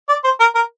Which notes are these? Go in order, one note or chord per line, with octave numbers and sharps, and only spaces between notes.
D5
C5
A#4
A#4